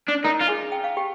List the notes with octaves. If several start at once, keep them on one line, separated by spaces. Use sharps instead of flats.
D4
D#4 A#4 A#5
F4
G#4 G#5
G5
F5
G4 G5